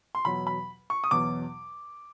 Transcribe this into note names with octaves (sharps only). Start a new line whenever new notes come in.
C6
E2 B2 F#3 B5
B5
C#6
D#6
E2 B2 F#3 D6